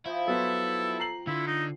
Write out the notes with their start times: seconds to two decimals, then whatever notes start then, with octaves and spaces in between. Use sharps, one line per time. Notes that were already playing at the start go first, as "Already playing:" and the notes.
0.06 F3 E4 G5 D#6
0.28 F#3 B3 F4 A4
1.00 A#5 C7 F#7
1.27 D3 E4 F4
1.47 D#4